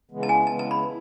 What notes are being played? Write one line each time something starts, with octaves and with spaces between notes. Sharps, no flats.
C#3 E3 G#3 B3
A5
G#5
C#3 E3 G#3 B3 A5
A5
B5
E4